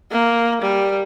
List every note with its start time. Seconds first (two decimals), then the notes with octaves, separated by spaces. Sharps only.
0.11 A#3
0.62 G3